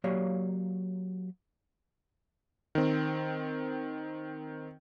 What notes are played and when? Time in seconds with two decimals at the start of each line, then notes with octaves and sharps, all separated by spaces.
0.04 F#3 A#3 G4 C#5 D5 F5
2.75 D#3 C4